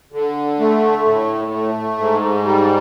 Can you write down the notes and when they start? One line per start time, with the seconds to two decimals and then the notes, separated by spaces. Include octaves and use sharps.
0.12 D3
0.59 A3
1.05 A2
1.51 A3
1.98 G#2
2.44 G3